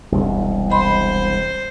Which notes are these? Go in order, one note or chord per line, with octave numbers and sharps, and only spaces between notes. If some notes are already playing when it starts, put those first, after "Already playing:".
E1 C2
C5 D#5 B5 C6